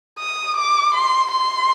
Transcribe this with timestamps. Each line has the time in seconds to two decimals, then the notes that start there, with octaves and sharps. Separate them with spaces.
0.19 D#6
0.57 D6
0.94 C6
1.31 C6